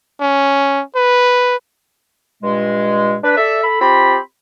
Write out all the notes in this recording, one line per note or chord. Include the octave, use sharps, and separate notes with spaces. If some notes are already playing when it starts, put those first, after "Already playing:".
C#4
B4
G2 A#2 G#3
D4 B4
A4 D5 E5
A4 B5
C4 F4 G4 B5